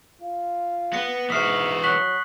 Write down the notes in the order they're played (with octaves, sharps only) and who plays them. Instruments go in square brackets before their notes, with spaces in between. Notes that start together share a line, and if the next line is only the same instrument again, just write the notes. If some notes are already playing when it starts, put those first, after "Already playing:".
[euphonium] F4
[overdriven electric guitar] B3 [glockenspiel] A#6 C#7
[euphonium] G#2 [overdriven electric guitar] E3 F#4 [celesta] E5 F6 B6 [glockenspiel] D#6 C7
[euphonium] F#3 [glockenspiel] C#6 F#6 F#7 [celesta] B6